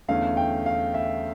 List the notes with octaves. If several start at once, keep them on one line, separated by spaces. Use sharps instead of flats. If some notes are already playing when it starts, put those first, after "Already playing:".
E2 D3 A3 C#4 E4 F5
G5
F5
E5